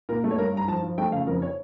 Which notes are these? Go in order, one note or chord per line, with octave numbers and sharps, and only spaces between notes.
A#2 A#4
A3
C#5
G2 A#4
G2 A#5
F3 A5
F3
A3 G5
C#3 F5
F2 A#4
C#5